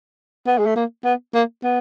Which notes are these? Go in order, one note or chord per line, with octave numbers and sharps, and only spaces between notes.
B3
G#3
A3
A#3
B3
A#3
B3